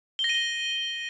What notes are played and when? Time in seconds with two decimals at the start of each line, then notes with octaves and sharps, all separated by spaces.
0.19 G7
0.24 A#6
0.29 D#7
0.35 G7